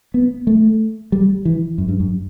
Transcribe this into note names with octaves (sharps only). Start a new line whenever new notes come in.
B3
A3
G3
E3
F#2
G2
F#2